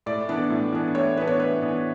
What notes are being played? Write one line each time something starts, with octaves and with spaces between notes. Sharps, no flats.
A2 D5
E3 B3 D4
A2
E3 B3 D4
A2 C#5
E3 B3 D4 B4
C#5
A2 B4
E3 B3 D4